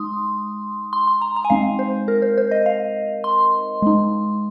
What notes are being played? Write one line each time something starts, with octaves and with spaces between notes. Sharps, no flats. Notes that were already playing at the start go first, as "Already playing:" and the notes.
Already playing: G#3 D#4 C6 D#6
C6
C6
A#5
A#5
G#5
G#3 C4 D#4 F5
C5
A#4
C5
C5
D#5
F5
C6
G#3 D#4